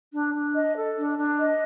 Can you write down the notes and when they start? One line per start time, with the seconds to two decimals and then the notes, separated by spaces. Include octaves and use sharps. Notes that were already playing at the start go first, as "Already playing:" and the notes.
0.12 D4
0.33 D4
0.54 D#5
0.76 A4
0.97 D4
1.17 D4
1.38 D#5